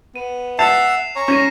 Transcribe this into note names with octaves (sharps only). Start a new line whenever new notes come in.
B3 D#7
E5 F#5 A5 C7 E7 F7
C#5 A#5
C#4 C#6 A#6 D#7